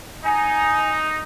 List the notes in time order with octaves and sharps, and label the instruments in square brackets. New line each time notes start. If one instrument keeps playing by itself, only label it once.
[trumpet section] D#4 [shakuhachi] G#5